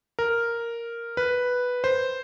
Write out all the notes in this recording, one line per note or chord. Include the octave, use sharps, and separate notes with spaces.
A#4
B4
C5